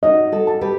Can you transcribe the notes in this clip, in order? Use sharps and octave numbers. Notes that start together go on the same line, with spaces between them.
D#4 F#4 D#5
F#4 A4
A5
G4 B4